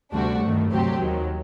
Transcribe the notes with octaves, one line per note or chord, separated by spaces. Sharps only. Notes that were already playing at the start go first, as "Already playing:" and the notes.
D2 C3 G3 D4 F#4
G2 D#3 A3
D2 C3 F#3 C4 G4
D#2 D#3 F#3